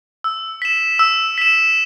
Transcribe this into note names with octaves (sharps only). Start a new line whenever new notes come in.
E6
B6 E7
E6
B6 E7